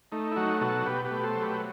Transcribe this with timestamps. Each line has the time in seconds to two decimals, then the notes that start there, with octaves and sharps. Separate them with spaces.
0.12 A3 D#4
0.32 E4
0.36 F#3 D#4 F#4
0.61 B2 F#4 A4
0.86 B2 G4 B4
1.05 G4 B4
1.11 A3
1.24 A4 C5
1.36 F#3
1.42 G4 B4